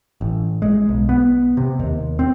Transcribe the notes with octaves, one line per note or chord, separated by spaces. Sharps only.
A1
G#3
B1
B3
C3
D#2
C4